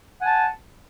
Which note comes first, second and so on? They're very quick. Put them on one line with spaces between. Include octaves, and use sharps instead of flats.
F#5 G#5 A5